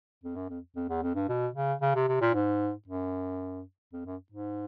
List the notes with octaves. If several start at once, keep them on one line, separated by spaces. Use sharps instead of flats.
F2
F#2
F2
F2
E2
F2
G2
B2
C#3
C#3
C3
C3
A#2
G#2
F#2
F2
F#2
G#2